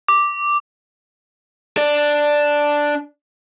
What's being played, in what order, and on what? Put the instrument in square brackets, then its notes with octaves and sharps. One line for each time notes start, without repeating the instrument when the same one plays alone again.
[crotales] D6
[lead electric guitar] D4 D5